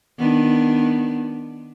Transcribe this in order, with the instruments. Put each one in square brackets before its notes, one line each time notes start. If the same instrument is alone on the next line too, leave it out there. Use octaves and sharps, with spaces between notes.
[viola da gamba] D#3 B3 D4